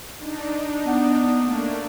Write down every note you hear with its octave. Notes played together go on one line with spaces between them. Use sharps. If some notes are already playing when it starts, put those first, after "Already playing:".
D4 D#4
B3
A3 A#3 D4